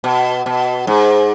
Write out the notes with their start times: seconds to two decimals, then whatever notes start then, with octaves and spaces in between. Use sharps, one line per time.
0.04 B2
0.46 B2
0.87 G#2